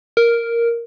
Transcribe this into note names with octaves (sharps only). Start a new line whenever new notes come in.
A#4